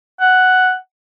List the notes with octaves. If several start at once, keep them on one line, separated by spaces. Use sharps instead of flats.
F#5